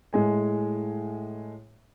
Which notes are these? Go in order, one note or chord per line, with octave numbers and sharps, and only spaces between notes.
A2 G#3 G#5